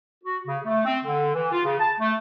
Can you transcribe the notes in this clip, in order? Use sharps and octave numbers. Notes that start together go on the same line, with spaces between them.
F#4
C#3
A3
C4
D3
E3
F4
C#3
A5
A3